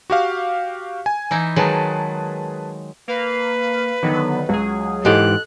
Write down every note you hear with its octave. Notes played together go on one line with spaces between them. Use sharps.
F#4 G4 F5
G#5
E3 D#4 E4
D#3 F#3 G#3 G#4 B4 A5
A#3 B4 F5
D3 D#3 F#3 B3
C#2 F#3 G#4
G#2 E3 G4 A4 D#5 F#6